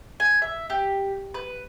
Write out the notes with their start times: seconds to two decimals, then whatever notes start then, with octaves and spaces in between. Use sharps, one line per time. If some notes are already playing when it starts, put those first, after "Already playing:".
0.20 G#5
0.42 E5
0.70 G4
1.34 B4